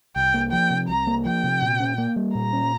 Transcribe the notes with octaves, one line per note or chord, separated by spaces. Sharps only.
C2 G5
A#3
F3 G5
C3
C2 A#5
A#3
F3 G5
C3
A#2
C#4
A#3
G3
A#2 A#5
C#4